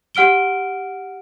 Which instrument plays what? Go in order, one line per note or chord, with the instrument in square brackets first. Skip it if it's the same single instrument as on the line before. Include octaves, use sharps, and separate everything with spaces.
[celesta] G4 F#5 F6 D7 G7